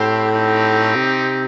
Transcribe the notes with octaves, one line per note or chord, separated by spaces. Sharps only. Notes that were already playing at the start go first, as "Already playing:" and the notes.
Already playing: A2 C4 G4 C5
C4 D#4 G4
C3